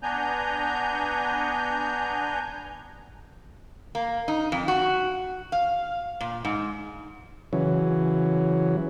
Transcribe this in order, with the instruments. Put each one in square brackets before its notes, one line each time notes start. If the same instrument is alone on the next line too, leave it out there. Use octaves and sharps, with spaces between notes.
[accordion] B3 D4 G#5 A#5 G6
[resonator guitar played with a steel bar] A#3
D#4
F2
F#4
F5
A#2
G#2
[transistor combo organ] C#3 E3 F#3